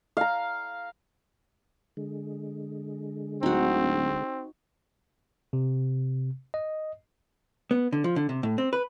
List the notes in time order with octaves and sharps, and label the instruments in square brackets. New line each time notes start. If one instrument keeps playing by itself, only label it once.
[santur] F5 A#5
[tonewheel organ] D3 G#3
[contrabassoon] D1 [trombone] C4 [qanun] D#4 F#4
[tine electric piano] C3
D#5
[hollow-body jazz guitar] B3
D3
F3
D3
C3
A2
C4
B4